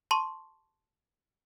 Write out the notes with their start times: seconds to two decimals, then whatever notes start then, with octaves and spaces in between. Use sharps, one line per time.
0.11 A5 C6 C#6